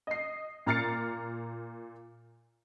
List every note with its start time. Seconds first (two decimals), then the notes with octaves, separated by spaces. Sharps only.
0.07 D#5 C7
0.66 A#2 A#5 F6 A6 C7 C#7